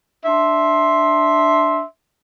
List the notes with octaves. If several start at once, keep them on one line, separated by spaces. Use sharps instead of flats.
D4 E5 C6